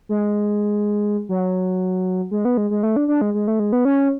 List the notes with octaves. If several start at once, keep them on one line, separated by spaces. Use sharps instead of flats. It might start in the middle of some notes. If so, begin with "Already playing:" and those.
G#3
F#3
G#3
B3
G#3
G#3
A3
D4
D4
G#3
G#3
A3
G#3
B3
C#4